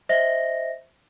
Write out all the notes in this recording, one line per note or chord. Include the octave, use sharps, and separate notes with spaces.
C5 D#5 E5 A#6